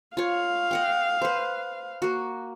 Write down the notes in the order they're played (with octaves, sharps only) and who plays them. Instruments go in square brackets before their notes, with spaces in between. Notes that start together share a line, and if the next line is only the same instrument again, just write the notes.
[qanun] F4 C#5 [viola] F5
[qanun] D#5 F#5 G5
B4 C5
A#3 F#4